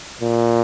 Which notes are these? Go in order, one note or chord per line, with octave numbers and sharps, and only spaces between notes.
A#2